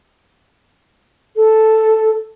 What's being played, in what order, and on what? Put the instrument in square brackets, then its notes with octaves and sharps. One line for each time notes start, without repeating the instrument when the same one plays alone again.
[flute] A4